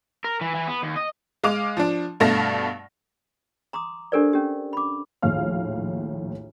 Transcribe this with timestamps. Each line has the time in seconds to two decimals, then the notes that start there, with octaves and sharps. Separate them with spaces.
0.24 A#4
0.41 E3
0.55 E3
0.68 B3
0.83 D#2
0.97 D#5
1.44 G#3 F5 D6 F7
1.77 F3 D4
2.20 G2 B2 A3 F5 A5 A#6
3.73 A#5 C6 D6 D#6
4.12 D4 G4 A4 A#4 C5 D5
4.33 C#4 G4
4.73 B5 D6
5.22 A#1 D#2 A2 F5 F6